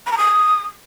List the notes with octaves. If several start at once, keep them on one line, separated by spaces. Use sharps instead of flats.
B5
A#5
D#6